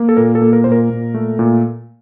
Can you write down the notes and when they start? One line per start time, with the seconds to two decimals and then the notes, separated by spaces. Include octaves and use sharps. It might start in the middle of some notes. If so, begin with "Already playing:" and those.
Already playing: A#3
0.09 A4
0.17 A#2 A#4
0.35 A4
0.42 A#3
0.53 A#4
0.64 A#2 C5
0.72 A#4
0.90 A#2
1.14 A3
1.39 A#2